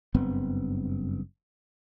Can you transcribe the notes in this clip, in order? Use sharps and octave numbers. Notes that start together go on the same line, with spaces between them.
F#1 G2 B3 C4